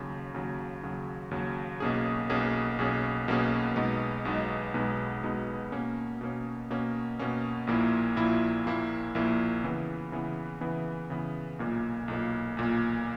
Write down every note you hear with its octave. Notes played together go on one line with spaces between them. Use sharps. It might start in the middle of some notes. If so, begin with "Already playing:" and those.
Already playing: D#2 C#3 F#3
D#2 C#3 F#3
D#2 C#3 F#3
D#2 C#3 F#3
B1 B2 A#3 C#4 G#4
B1 B2 A#3 C#4 G#4
B1 B2 A#3 C#4 G#4
B1 B2 A#3 C#4 G#4
B1 B2 G#3 B3 D#4
B1 B2 G#3 B3 D#4
B1 B2 G#3 B3 D#4
B1 B2 G#3 B3 D#4
B2 A#3 C#4
B2 A#3 C#4
B2 A#3 C#4
B2 A#3 C#4
A#1 A#2 A#3 E4
A#1 A#2 A#3 E4
A#1 A#2 A#3 E4
A#1 A#2 A#3 E4
C#3 E3 B3
C#3 E3 B3
C#3 E3 B3
C#3 E3 B3
B1 A#2 A#3
B1 A#2 A#3
B1 A#2 A#3